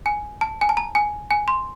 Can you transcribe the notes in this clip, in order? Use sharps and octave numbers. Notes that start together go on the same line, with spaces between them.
G#5
A5
G#5
A5
A#5
G#5
G#5
C6